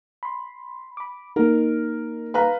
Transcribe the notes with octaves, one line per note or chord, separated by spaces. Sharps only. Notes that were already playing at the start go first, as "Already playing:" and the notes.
B5 C6
B5 D6
A#3 D#4 A#4
B4 F5 A#5